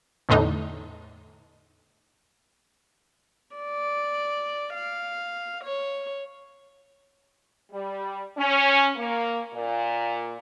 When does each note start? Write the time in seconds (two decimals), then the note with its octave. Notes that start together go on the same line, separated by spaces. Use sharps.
0.29 E2 A2 D3 D#4
3.56 D5
4.74 F5
5.64 C#5
7.71 G3
8.38 C#4
8.96 A#3
9.54 A#2